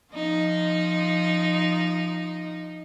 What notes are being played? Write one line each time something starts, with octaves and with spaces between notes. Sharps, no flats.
F3 D#4